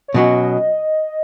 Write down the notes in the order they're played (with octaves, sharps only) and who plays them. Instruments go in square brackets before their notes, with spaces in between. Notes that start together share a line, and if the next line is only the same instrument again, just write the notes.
[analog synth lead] C#5
[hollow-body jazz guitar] B2 F#3 C#4 F#4 [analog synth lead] D#5
[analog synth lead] D#5